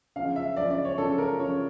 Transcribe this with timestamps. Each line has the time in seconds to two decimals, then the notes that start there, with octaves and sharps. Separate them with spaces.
0.16 C#3 F5
0.19 F3
0.36 E5
0.57 C#3 F3 D5
0.70 D5
0.85 C#5
0.98 C#3 F3 A4
1.18 A#4
1.39 C#3 F3 C#5